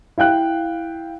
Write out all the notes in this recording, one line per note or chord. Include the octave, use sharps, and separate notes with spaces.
E4 F5 G5 F#6